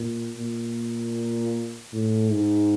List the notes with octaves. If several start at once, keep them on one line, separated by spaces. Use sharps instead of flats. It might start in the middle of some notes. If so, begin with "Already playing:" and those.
Already playing: A#2
A#2
A2
G#2